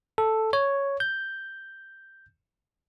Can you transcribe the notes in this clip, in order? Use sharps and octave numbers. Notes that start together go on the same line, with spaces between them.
A4
C#5
G6